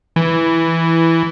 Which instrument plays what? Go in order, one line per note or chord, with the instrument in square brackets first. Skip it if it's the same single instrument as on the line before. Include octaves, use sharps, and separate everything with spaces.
[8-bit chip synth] E3